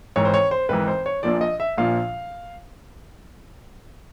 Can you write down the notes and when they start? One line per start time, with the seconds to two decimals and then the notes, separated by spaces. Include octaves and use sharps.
0.16 G#1 G#2 E3 C#5
0.25 C5
0.34 C#5
0.51 C5
0.69 G#1 G#2 E3 B4
0.88 C5
1.06 C#5
1.23 A#1 A#2 F3 D5
1.41 D#5
1.60 E5
1.77 A#1 A#2 F3 F5